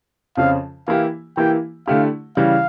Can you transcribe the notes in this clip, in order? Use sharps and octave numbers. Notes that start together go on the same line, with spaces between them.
F2 C#3 F3 C#4 F4 F5
E3 A#3 E4 G4 F5
E3 A#3 E4 G4 G5
D3 A3 E4 G4 F5
C#3 E3 G3 F5